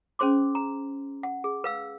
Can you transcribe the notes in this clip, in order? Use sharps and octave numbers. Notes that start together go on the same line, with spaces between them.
C#4 G#4 C5 C6 D6
A#5
F#5
G#4
B4 F5 E6